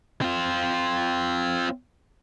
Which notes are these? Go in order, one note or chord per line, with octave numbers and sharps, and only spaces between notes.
C4 F4